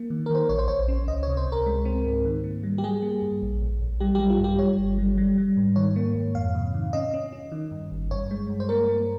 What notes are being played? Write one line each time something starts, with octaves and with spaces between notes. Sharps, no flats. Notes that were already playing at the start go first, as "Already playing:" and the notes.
Already playing: A#3
D#3
A#4
D#3 C5
A#1 C#5
C5
A#1 C#5
C#4
C#2 D#5
C#5
C3
C5
C#2
A#4
G#3
C4
G#2
D#3
A#3
G3
G4
G3 G#4
A#3
G2
A#1
A#1
A#1
G3 G4
G4
G3
F4
G2
G4
G3 C#5
G1
G3
G3
G3
G#2
D#3 C#5
A#3
G#2
F2 F5
C3
D#3
C#4 D#5
C#4
C#4
D#3
G2
G1
G2 C#5
G#3
G2
C5
A#3 A#4
A#3